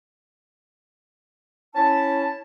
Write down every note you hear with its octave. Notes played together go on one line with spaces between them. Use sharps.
C#4 E4 A5